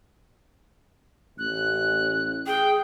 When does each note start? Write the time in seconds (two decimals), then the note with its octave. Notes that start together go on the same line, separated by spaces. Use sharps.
1.38 A1 F#6
2.47 G#4 G5